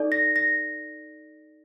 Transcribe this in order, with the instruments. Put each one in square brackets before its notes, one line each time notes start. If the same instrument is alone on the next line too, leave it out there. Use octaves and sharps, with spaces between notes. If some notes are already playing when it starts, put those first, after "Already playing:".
Already playing: [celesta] D#4 A4 D5
A#6
A#6